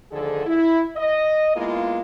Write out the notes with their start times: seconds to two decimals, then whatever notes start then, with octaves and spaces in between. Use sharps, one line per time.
0.12 D2 D3 D#3 F3 G#4 A4
0.46 E4
0.97 D#5
1.56 G#3 A#3 B3 E4 F4